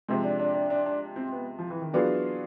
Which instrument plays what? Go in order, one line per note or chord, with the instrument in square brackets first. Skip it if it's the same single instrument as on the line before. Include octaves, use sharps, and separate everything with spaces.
[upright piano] C3 F3 G#3 [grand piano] C4
[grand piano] D4
D4
D4
D4
D4
C4
B3
F3
E3
D#3
[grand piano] E3 [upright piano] F#3 B3 D4 F4 G#4